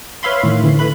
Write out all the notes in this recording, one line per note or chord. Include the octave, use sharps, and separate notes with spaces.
B4 C#5 E5 F5 B5 C6
A2 D#3
D3 E3
A3 B4 B5